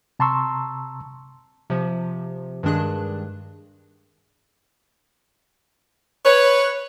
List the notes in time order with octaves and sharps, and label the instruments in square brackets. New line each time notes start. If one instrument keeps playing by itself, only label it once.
[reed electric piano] C3 A5 A#5 C6 C#6 E6
[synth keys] C3 F3
G2 D#3 G#3 D4 G#4 F#6
[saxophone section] B4 C#5